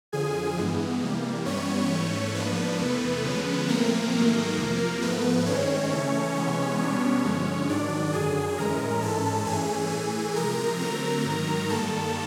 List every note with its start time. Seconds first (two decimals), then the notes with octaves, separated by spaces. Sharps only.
0.12 F2 D3 F3 G#4 G#5
0.58 G2 E3 G#3 B3
1.02 C3 E3 G3 A#3
1.46 G2 E3 G3 B3 C#4 C#5
1.91 G#2 E3 A3
2.34 G#2 F3 A#3 B3 D4 B4
2.79 E2 C3 E3 A3
3.25 D3 F3 G#3 C#4
3.68 A#2 F3 A3 A#3 C4 A#4
4.13 G#2 D#3 F#3 A3
4.58 F2 C3 F3
5.01 G#2 F3 A3 B3 B4
5.46 G2 D#3 G#3 C4 C#4 C#5
5.91 C#3 E3 A3
6.36 C3 E3 G#3 B3
6.79 B2 G3 B3 C#4 D4 C#5
7.24 G2 D3 F3 G#3 C#4
7.69 G#2 D#3 F#3 D4 D5
8.13 F#2 D3 F#3 G#4 G#5
8.58 A2 E3 G#3 C#4 A#4 A#5
9.02 G#2 E3 G#3 C#4 A4 A5
9.46 G2 E3 A3 C#4 G#4 G#5
9.91 A2 E3 A3
10.36 C3 F3 G#3 A#4 A#5
10.80 D3 F#3 A3 C4
11.25 G#2 D#3 F#3
11.69 G2 D#3 G3 A#3 A4 A5